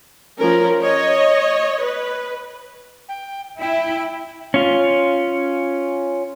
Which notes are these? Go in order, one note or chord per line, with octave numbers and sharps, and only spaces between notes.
F3 C#4 A#4
C#5 D#5
B4
G5
E4 G5
C#4 F4